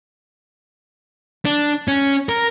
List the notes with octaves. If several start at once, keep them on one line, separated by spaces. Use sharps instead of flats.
D4
C#4
A#4